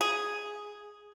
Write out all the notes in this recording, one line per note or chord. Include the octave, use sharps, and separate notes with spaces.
G#4